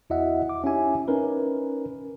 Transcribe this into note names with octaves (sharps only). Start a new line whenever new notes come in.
E2 E4 F#4 D#5 E5 F#5
D6
C#4 D#4 E4 G4 E5 G#5
C#4 D#4 A#4 B4